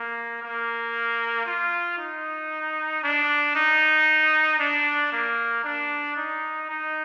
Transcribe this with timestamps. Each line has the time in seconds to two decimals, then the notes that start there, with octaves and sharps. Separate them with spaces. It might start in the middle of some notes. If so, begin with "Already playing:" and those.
Already playing: A#3
0.42 A#3
1.46 F4
1.99 D#4
3.04 D4
3.55 D#4
4.59 D4
5.12 A#3
5.64 D4
6.17 D#4
6.69 D#4